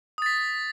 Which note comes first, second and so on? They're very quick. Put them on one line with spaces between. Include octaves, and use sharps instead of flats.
D#6 A6 B6